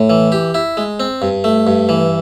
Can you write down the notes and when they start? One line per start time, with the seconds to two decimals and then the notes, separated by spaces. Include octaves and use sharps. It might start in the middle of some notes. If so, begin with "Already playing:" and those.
Already playing: A2
0.10 E3
0.32 G4
0.54 E4
0.77 G#3
1.00 C4
1.22 G2
1.44 A3
1.67 G2
1.89 E3